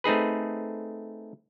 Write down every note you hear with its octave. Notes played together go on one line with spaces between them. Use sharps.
A3 C4 D#4 G#4 B4